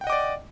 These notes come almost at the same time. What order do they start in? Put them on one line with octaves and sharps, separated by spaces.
G5 F#5 D#5 D6 D5